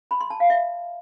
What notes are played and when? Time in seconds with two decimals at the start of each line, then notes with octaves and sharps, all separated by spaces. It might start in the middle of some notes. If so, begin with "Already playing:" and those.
0.11 B5
0.21 C6
0.30 A5
0.40 F5
0.50 E5